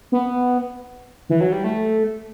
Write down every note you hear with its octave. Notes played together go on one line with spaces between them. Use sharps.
B3
E3
F#3
G3
A3